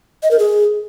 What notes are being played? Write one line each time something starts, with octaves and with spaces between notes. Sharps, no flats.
D#5
A#4
G#4